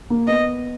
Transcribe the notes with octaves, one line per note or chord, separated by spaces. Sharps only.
A#3
B3 D#5